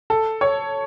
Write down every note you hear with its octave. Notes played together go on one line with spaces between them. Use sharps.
A4
C#5